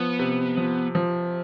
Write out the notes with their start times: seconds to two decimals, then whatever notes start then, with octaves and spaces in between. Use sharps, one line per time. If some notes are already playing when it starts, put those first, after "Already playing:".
Already playing: F3 B3
0.19 C3
0.57 F3
0.95 F3